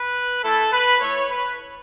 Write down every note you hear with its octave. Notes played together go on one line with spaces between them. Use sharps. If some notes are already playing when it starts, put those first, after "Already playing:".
Already playing: B4
A3 E4 A4
B4
A3 E4 C#5
B4